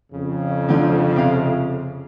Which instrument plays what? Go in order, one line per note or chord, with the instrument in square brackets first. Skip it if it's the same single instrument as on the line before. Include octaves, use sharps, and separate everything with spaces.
[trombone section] F2 C#3
[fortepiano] D3 F3
C3 F5